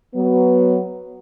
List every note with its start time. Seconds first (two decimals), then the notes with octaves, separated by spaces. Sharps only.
0.15 F#3 B3